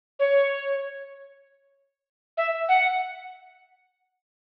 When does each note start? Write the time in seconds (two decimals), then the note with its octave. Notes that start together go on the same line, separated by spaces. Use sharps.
0.19 C#5
2.37 E5
2.69 F#5